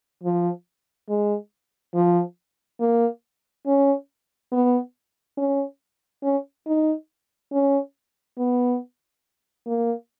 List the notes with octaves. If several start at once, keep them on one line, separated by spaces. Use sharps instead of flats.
F3
G#3
F3
A#3
C#4
B3
C#4
C#4
D#4
C#4
B3
A#3